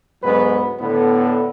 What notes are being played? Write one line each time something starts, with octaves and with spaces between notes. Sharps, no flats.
D2 G#2 F#3 B3 B4
A2 D3 B3